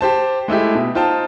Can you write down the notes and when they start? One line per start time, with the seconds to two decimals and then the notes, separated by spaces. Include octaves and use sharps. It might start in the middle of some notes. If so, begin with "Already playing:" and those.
0.01 G4 C5 A5
0.48 G#3 A3 E4 G4
0.75 B2
0.95 D#4 F4 C5 G5 A5